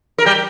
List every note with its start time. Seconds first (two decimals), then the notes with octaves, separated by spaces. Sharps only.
0.18 A#4
0.26 G3 G4